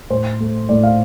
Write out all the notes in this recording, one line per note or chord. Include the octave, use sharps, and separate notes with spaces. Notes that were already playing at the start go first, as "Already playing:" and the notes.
A2 C5
A3
A2 D5
F5